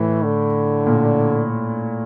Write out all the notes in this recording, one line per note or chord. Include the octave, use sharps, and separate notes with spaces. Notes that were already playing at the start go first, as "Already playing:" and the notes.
Already playing: A2 E3
D3
A#2